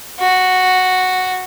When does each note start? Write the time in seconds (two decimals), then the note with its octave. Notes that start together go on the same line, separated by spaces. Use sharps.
0.19 F#4